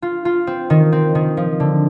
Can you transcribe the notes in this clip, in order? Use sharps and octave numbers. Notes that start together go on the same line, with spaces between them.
F4
F4
C4
D#3
C4
D#3
F3
D3